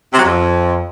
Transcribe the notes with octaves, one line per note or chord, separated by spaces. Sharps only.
C3
F#3
F2